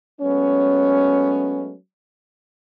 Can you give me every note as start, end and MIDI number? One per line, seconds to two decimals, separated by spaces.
0.21 1.75 54
0.21 1.75 56
0.21 1.75 57
0.21 1.75 59
0.21 1.75 61